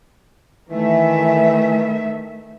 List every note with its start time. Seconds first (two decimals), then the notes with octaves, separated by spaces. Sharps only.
0.69 D#3 E3 A3 E5